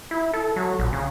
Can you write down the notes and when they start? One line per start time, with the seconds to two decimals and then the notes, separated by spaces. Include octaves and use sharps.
0.11 E4
0.34 A4
0.56 F#3
0.79 A#1
0.93 C#3